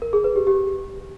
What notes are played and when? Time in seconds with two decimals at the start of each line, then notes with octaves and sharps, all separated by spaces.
0.02 A#4
0.13 G#4
0.24 B4
0.36 G4
0.47 G4